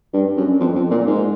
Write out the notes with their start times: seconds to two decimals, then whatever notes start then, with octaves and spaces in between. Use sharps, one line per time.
0.14 G2
0.37 F#2
0.60 F2
0.75 F2
0.91 A#2
1.06 G#2